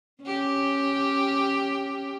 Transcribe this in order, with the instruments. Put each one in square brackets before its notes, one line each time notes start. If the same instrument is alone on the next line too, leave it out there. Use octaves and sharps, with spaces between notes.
[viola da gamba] C#4 G4